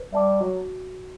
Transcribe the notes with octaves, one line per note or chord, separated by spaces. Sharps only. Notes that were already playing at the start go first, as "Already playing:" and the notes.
Already playing: B4
G3 E5 A5 D6
F#3 F#4